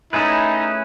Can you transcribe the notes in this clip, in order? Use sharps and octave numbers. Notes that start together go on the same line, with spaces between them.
A3 C#4 D#4 E4 G#4 B4